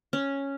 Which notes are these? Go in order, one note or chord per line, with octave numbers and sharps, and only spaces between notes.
C#4